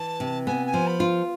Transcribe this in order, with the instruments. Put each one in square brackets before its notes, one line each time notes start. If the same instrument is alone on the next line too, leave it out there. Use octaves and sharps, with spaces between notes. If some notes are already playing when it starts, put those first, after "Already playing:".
Already playing: [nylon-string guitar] E3 [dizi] A5
[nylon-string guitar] C3
[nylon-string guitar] B3 [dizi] G#5
[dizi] G#5
[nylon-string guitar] F3
[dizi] B5
[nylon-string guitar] F4